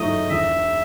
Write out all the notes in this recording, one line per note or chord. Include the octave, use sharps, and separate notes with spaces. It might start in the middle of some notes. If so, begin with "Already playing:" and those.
Already playing: G#2 F#3 A3 D#4 D#5
E1 E5